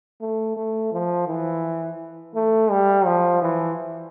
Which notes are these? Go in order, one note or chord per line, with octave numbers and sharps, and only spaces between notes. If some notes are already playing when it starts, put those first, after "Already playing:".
A3
A3
F3
E3
A3
G3
F3
E3